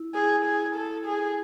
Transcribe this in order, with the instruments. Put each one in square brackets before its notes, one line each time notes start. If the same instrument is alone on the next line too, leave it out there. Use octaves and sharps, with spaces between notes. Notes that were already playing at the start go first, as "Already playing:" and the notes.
Already playing: [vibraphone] E4
[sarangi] G#4
G#4
A4
G#4